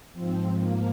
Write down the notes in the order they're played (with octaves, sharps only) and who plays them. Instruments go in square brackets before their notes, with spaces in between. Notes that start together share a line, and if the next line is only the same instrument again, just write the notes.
[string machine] G#2 F3 C4
A#3